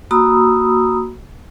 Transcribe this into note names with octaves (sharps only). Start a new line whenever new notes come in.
A#3 F#4 A#5 B5 D#6 E6